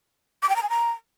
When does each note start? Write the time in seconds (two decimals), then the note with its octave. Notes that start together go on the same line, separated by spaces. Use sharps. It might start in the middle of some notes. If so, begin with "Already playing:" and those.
0.43 D6
0.49 G5
0.56 A#5
0.63 G#5
0.70 A#5